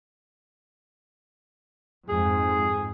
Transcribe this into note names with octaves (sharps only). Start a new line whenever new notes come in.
F2 G#2 G#4